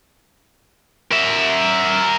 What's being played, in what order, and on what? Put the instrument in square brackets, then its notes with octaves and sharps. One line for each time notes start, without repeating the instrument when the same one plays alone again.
[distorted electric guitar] A#4 E5